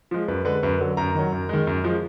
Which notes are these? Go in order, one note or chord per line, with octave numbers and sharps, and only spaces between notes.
F3 G#3
F#2 B4
D3 G#3 B4
F#2 B4
D3 F#3
F#2 A#5
D#3 F#3
F#2
D#3 G#3
F#2
F3 G#3